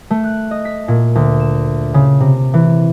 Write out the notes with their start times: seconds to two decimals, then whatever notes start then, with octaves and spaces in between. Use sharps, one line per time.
0.11 A3
0.24 F#6
0.51 D#5
0.65 B6
0.88 A#2
1.15 D2
1.40 E7
1.94 C#3
2.20 C3
2.54 E3